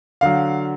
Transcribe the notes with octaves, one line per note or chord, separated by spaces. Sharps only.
D3 F#3 F5